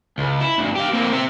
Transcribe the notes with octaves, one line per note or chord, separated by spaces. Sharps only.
C#2
E4
D2 G2
G4 F5
A#3 C4
C4 E5